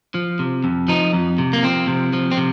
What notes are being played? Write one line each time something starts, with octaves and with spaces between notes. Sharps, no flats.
F3
C3
F2
F3 D#4
F2
C3
A#3
F3 C4
C3
F3
C4
C3